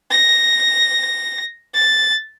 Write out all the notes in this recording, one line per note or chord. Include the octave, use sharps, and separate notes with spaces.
A#6
A6